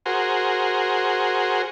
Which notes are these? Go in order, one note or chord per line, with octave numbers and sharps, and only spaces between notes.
F#4 G#4 A#4 C5